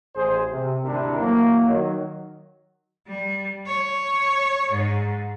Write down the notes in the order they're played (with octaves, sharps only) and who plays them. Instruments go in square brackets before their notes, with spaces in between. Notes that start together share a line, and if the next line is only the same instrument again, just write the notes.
[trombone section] A1 G#4 C5
C3
G#1 D2 C3 D4 E4 A#4
E3 F#3 A3 A#3
D#3 F#3
[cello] G3
C#5
G#2